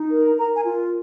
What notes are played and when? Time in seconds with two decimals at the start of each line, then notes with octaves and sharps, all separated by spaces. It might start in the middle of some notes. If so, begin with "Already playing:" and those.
Already playing: D#4
0.10 A#4
0.38 A#4 A#5
0.55 G#5
0.65 F4